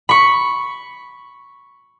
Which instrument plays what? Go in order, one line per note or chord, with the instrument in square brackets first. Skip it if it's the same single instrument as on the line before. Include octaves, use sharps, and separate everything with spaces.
[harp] B5 C#6